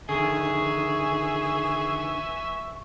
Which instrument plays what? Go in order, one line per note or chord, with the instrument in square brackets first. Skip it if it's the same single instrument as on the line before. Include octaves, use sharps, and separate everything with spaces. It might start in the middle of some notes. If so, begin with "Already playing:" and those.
[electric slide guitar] D3 D#3 [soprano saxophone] G#4 [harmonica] E5 G#5 [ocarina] C#6